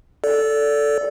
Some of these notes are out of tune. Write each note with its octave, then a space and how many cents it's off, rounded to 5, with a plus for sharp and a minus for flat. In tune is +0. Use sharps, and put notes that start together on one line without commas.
A4 +0 D5 -20